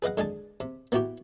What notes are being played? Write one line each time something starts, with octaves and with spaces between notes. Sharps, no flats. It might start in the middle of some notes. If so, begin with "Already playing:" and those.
G#4 B4 D#5 F5 F#5
D3 G#3 G#4 A5
C3
A#3 B3 E4 F#4 G4